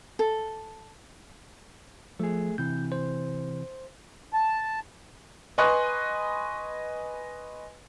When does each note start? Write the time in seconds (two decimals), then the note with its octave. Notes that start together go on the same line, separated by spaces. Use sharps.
0.19 A4
2.19 F3 A3 G#4
2.58 C3 E3 G6
2.92 C5
4.33 A5
5.58 B4 D#5 G#5 C6 C#6 F#6